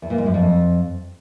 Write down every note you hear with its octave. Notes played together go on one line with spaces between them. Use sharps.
E2
A#2
G#2
F#2
F2